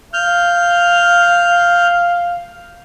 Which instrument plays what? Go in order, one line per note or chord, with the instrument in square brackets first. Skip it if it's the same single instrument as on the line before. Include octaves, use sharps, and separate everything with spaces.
[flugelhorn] F5 [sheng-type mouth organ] F6 G6